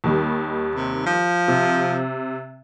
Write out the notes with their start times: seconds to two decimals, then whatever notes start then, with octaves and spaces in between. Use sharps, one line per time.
0.04 D#2 D#3 G3
0.76 C3
1.06 F3
1.48 C3